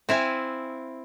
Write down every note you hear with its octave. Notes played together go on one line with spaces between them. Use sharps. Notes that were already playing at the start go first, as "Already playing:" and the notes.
C4 E4 F5 G#5